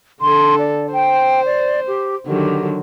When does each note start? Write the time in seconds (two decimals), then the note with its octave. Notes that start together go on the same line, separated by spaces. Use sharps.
0.21 D3 A4 C6
0.58 D5
0.93 C5 G5
1.45 D5
1.87 G4
2.27 D3 D#3 F#3 G4